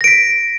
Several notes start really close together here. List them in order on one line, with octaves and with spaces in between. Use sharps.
A#6 D7 B6